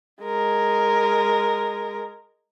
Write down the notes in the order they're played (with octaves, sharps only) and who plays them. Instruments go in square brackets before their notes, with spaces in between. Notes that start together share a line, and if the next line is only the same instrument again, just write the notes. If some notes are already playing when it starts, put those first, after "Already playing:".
[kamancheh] G#3 A#4